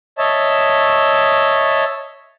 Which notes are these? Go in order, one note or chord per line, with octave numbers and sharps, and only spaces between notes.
C#5 D#5 E5 A5